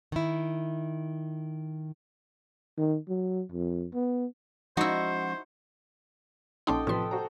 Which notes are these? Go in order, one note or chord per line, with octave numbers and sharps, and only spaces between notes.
D#3 E4
D#3
F#3
F2
B3
F3 G#3 C#4 D#4 E4 F#4 C5
A#1 C#4 D#4 A4 D#5 G5 C6 D6
A2 C3 F3 B4 C6
F#4 C5 A#5